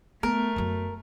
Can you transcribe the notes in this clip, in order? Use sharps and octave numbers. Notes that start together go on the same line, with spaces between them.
A3 B3 A#4
F#2 F#3